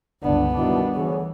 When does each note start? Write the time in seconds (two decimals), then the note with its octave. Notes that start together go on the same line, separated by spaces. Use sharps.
0.23 G1 C#2 B3 D4
0.56 B2 D#3 G3 D4 E4
0.95 D2 E3 G#4 C#5